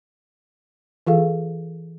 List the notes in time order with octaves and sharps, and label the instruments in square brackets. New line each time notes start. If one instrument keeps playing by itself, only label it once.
[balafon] E3 F4 G#4 A4 F5